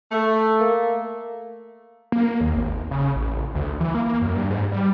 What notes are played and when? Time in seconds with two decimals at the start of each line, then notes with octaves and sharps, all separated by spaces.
0.12 A3
0.60 A#3
2.12 A#3
2.41 D#2
2.55 G#1
2.91 C#3
3.16 A1
3.55 D2
3.80 E3
3.95 A#3
4.22 F#2
4.35 G2
4.50 G#2
4.72 G3